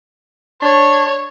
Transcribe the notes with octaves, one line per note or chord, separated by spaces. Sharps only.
D4 C#5